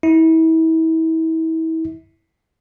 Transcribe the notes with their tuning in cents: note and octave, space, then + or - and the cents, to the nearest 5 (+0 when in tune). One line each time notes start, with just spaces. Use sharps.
E4 -35